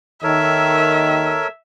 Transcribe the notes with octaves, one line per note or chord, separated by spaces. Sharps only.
D#2 D#3 A4 A#4 C#5 E5